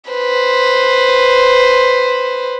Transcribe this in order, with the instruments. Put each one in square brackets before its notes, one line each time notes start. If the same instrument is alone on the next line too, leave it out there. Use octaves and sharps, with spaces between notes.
[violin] B4 C5